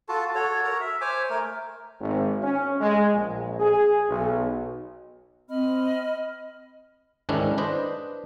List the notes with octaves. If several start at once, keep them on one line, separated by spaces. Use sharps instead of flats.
F4 F#4 A4 A5
F#4 A4 C#5
A#4 A#5
E5
C5 C#5 G#5 D6
A3 A#4
G#1
C#4
G#3
A#1
G#4
B1
C4 D#5 B5 F6
G#2 D#3 C#4 D4 E4
D4 B4 C5 D#5